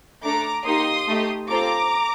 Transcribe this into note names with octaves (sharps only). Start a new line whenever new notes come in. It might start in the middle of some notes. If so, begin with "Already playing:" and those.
A3 D4 A4 A#5 D6
A#3 D#4 G4 C6 D#6
A3 D#4 G4
C4 F4 A4 A#5 D6